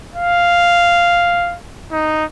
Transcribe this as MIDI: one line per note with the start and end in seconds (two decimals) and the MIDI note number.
0.15 1.57 77
1.92 2.25 63